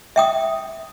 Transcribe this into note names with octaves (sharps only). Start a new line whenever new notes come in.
E5 G5 D#6